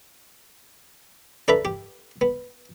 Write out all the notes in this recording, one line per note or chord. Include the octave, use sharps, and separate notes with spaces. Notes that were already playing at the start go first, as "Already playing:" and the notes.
D4 A4 B4 E5 A#5 B5
G4
B3